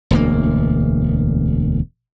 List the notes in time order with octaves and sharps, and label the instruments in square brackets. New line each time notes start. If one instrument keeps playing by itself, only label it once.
[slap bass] E1 D2 A#3